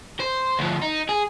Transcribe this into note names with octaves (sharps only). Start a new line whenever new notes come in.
C5
D2 F3
D#4
G#4